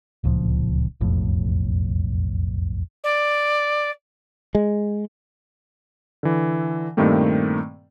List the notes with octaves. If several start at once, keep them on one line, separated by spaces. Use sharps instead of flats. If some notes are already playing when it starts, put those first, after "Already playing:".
D1 C#2 A#2 F3
E1 B1 F2 A2
D5
G#3
D3 E3
G2 A#2 D#3 A3 A#3 C4